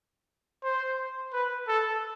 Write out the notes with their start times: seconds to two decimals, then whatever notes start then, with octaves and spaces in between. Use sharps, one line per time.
0.63 C5
1.33 B4
1.68 A4